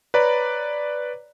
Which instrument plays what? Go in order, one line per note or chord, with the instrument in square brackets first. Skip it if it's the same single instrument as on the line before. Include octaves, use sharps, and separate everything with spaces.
[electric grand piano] B4 C#5 D5 A#5 B5